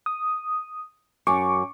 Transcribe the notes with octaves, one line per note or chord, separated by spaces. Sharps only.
D#6
F#2 C#6 D6